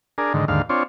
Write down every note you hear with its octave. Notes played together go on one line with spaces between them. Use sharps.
D4 G#4 A#4
G#2 D3 D#3
D#2 G#2 D3 F5
C4 D4 F4 C#5